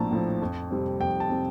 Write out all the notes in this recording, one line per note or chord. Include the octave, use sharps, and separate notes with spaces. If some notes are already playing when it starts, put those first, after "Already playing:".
Already playing: A#1 A2 F3 C4 A5 A#5
A2 F3 C4
F2
C3 G3 C4
F2 G5
A5
C3 G3 C4